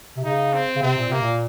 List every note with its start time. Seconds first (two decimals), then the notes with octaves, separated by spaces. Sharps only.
0.17 C3
0.24 C#3 D#4
0.54 C4
0.76 C#3
0.82 C3 C4
0.97 A#2
1.09 C3 A#3
1.22 A#2